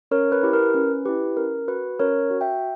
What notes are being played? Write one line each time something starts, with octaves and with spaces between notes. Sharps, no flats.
C#4 A#4 C#5
B4
E4 G4
A#4
C#4 B4
E4 G4 B4
C#4 A#4
F#4 B4
C#4 A#4 C#5
F#4
E5 G5